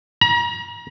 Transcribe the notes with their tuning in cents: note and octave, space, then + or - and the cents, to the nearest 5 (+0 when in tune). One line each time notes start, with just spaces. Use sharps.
A#5 +35